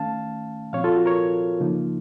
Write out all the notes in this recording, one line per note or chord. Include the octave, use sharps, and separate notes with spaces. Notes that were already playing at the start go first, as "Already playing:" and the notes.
Already playing: D#3 A3 C#4 F5 A5
A#2 F3 C4 C#5 F5
F4 A4
F#4
A#4 C#5
C#3 F3 A#3 D#4